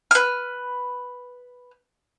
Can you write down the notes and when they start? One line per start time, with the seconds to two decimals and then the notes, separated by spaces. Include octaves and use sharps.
0.11 B4 F6